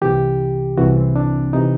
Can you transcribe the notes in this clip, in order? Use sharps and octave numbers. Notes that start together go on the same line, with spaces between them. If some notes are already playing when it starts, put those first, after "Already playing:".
C2 C3 E3 G4
C2 C3 E3 F#4
C4
D4
C3 E3 D#4